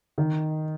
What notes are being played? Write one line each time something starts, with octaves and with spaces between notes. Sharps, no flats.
D#3